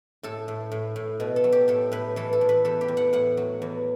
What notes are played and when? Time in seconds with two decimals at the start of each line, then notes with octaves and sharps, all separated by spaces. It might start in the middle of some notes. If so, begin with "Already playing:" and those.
0.23 A2 A4
0.48 A2
0.72 A2
0.96 A2
1.20 B2
1.36 A4
1.44 F#3
1.52 G4
1.68 A2 A4
1.92 A2 B4
2.16 E3 A4
2.33 A4
2.41 A2
2.49 B4
2.65 E2 A4
2.81 G4
2.88 E2
2.97 F#5
3.13 A2 F#5
3.37 F#3
3.62 E2